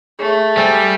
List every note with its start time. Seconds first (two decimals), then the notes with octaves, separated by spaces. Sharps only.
0.19 A3 G#4
0.57 G3 C5 G#5 E6